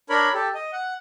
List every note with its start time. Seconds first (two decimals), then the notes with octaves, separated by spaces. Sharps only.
0.10 D4 A#4 C#5 B5
0.34 G4 A4
0.55 D#5
0.73 F#5